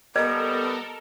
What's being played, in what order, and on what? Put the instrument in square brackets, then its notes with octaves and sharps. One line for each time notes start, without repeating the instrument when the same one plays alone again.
[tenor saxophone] G3 [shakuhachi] B3 [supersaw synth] A4 A#4 [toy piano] D#5